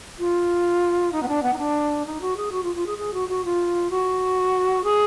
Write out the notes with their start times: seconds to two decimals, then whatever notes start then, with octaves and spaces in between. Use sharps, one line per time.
0.19 F4
1.12 D#4
1.23 B3
1.28 D4
1.43 B3
1.53 D#4
1.58 D4
2.06 D#4
2.21 F#4
2.37 G#4
2.52 F#4
2.63 F4
2.75 F4
2.86 G#4
2.98 G#4
3.14 F#4
3.29 F#4
3.45 F4
3.90 F#4
4.84 G#4